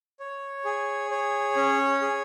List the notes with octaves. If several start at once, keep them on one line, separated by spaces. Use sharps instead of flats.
C#5
G#4
C#5
C#4
G#4